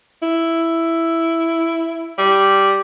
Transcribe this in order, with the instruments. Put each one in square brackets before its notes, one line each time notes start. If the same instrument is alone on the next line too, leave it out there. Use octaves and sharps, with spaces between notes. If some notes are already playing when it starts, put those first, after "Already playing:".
[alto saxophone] E4
[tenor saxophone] G3